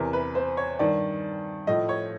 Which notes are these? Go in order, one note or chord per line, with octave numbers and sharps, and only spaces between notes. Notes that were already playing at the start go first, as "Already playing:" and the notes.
Already playing: E2 C3 E3 A#4
B4
C5
C#5
G2 D#3 D5
A2 F3 D#5
C#5